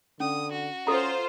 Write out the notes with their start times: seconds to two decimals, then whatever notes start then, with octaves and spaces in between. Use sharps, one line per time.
0.20 D3 C#4 D#6
0.52 F#4
0.87 C#4 F4 A4 C5 A#5